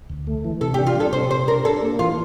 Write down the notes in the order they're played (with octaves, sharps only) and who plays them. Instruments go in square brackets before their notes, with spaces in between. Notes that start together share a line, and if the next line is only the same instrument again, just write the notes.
[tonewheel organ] D2
A3
E3
[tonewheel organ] C3 [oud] A4
[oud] G4
[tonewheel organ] D4
[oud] F4
[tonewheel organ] G3 [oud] A4
[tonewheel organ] C3 [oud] C5
[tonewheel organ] C3 [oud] C5
[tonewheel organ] D4 [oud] A#4
[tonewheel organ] D4 [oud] A4
[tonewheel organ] A#3
[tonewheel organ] E3 [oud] F4